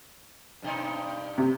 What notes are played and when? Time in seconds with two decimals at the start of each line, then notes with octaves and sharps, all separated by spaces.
0.62 G2 B2 D#4
1.38 C3